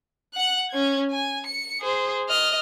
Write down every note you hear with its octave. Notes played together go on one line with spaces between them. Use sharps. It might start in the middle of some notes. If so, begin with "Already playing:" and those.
F#5 F#6
C#4 G#6
G#5
C#7
G#4 C5
D#5 F6